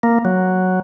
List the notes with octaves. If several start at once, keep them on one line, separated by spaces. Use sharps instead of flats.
A#3
F#3